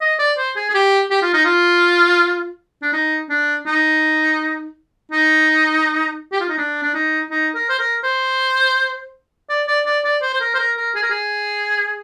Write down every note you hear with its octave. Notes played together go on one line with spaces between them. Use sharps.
D#5
D5
C5
G#4
G#4
G4
G4
F4
D#4
F4
D4
D#4
D4
D#4
D#4
G4
F4
D#4
D4
D4
D#4
D#4
A#4
C5
A#4
C5
D5
D5
D5
D5
C5
C5
A#4
C5
A#4
A#4
G#4
A#4
G#4